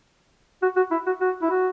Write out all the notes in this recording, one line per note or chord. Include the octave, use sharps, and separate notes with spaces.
F#4
F#4
E4
F#4
F#4
E4
F#4